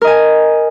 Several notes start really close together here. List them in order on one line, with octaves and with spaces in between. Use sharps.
A#4 D#5 G#5